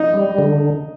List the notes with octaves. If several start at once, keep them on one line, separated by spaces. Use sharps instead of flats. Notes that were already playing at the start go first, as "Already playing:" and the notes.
Already playing: D#4
G3
D3